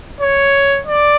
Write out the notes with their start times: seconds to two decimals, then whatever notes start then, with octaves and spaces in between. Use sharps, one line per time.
0.21 C#5
0.87 D5